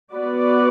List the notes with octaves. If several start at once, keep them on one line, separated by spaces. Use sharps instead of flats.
B3 F#4 B4 D5